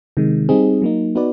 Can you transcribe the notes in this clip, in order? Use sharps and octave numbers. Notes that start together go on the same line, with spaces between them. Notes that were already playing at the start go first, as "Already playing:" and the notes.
C3 D#3 G#3
G3 C4 D#4 G#4
F#3 A#3 D#4
B3 D#4 F#4 B4 D5